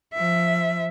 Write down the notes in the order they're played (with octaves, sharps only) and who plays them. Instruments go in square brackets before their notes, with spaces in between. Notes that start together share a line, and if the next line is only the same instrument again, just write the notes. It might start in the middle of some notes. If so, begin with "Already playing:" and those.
[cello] F3 E5